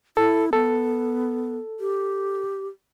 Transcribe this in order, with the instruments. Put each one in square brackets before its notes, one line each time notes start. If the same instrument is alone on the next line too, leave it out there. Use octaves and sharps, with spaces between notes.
[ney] E4 [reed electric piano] A4
[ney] B3 [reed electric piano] A4
[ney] G4